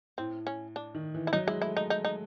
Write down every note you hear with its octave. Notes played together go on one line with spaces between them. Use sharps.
A2 C4
C#4
D4
D#3
E3
E4
F#3 D#4
G#3 E4
A3 E4
A3 D#4
D#4
D#4